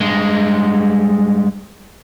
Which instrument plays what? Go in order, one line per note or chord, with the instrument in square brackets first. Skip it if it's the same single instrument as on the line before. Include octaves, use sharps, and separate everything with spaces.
[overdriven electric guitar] G2 G#3